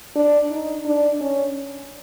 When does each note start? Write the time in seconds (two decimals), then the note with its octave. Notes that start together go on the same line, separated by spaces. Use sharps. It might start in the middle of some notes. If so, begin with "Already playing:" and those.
0.16 D4
0.51 D#4
0.86 D4
1.21 C#4